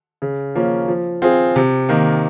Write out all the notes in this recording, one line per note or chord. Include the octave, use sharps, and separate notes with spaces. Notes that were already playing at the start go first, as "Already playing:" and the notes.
C#3
F3 A#3 C#4
F3
C4 F4 G#4
C3
D#3 A#3